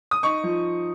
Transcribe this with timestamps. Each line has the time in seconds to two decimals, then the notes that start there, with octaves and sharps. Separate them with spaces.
0.11 D#6
0.23 D#4 C#6
0.43 F3